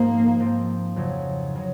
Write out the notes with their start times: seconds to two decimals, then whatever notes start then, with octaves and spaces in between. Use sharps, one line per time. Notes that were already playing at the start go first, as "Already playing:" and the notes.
Already playing: G#2 F3 A#3 C4 D#4
0.38 G#2 F3 C4 D#4
0.96 F2 C#3 F#3
1.55 C#3 F#3